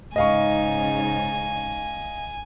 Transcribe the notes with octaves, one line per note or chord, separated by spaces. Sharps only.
G#2 C#3 D#4 D#5 F5 G#5 C#6